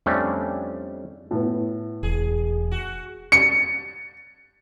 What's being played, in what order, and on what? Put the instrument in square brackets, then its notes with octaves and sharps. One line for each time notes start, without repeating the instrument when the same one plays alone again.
[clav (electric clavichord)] F2 G3 A3 C#4 D4
[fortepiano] A2 B3
[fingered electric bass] E1 [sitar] G#4
[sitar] F#4
[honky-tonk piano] C#7